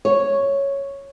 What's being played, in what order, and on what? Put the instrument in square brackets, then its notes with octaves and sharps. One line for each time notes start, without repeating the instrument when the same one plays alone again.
[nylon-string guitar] C#5